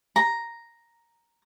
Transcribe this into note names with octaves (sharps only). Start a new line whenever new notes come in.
A#5